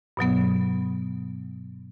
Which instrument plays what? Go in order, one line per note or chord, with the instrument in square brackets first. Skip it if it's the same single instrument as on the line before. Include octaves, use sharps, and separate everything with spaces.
[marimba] G2 B2 F#3 B3